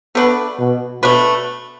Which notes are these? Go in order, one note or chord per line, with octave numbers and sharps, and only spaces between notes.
A3 B3 D4 B4
B2
B2 A3 D4 B4